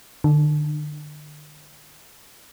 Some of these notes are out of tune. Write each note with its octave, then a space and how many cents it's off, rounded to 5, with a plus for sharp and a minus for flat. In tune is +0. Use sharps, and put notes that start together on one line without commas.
D3 +35